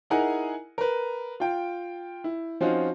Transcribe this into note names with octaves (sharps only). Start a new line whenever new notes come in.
D#4 E4 G#4 A#4 F#5 G#5
A#4 B4
F4 G5
E4
F3 C4 C#4 D#4 F4 F#4